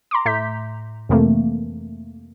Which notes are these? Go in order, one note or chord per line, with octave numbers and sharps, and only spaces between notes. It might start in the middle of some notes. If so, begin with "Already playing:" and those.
A#5 C6 D6
A2 E5 G6 B6
F2 C3 E3 A3 A#3 C4